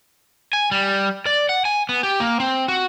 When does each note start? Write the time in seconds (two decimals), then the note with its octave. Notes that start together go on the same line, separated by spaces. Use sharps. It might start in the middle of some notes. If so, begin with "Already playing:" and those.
0.53 G#5
0.71 G3
1.26 D5
1.49 F#5
1.65 G#5
1.89 B3
2.03 G4
2.20 A#3
2.40 C4
2.68 F#4